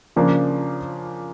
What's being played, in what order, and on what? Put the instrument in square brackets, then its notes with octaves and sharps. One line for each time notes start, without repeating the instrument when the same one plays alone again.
[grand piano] C#3 F3 A#3 D4